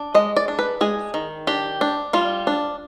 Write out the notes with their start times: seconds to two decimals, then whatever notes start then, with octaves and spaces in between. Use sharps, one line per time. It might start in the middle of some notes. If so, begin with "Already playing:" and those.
Already playing: D4
0.14 G#3 D#5
0.37 D5
0.48 D4
0.59 B4
0.81 G#3 G#4
1.14 D#3
1.47 D4 G4
1.81 D4
2.13 G3 F4
2.47 D4